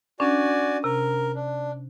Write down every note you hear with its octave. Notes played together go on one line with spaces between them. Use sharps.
C#4 D4 F#4 D5 G#5
C3 A#4
D4